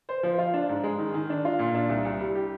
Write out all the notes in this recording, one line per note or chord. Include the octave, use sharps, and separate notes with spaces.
C5
F3
F4
D4
G#2
G#3
D#3
D#3
D4
F4
A#2
D4
C2
C2
G3
G4